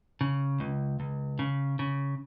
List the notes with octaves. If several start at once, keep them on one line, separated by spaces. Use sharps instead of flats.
C#3
C#2
C#2
C#3
C#3